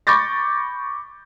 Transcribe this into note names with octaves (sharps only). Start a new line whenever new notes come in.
B5 C#6 D6 G6 A6 A#6